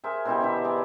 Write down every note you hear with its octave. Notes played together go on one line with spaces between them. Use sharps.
G#4 A#4 C5 E5
B2 C4 E4 G4
D3 E3 E5
G#4 D5